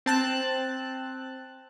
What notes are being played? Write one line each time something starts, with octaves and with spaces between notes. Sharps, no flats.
C4 A5 F#6